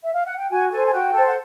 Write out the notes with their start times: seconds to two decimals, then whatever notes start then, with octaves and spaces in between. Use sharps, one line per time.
0.03 E5
0.14 F5
0.27 F#5
0.38 G5
0.50 F#4 G#5
0.72 A4 C5 G#5
0.87 G#5
0.92 F#4 G5
1.13 A4
1.18 C5
1.28 F#5